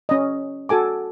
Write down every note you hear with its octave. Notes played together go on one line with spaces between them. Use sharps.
C#4 D#5
F#4 A4 G#5 D6